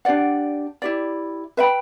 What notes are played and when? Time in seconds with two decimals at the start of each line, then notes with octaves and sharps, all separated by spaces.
0.05 D4 G4 D5 F#5
0.82 E4 G4 D5
1.57 B4 E5 G5 B5